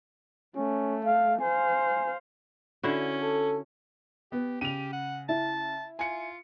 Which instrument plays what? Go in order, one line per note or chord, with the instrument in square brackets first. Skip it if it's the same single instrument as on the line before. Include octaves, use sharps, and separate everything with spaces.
[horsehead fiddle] A3 [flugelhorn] C#4
[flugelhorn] F5
[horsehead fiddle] C5 F5 [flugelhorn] G#5
[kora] D3 E4 F#4 [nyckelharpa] C#4
[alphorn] A4
[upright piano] B3 [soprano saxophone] G4
[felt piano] C#3 [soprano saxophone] G4 [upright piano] D#7 F7
[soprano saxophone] F#5
[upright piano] E4 [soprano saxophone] A5
[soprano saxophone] F4 [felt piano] G#5 C#7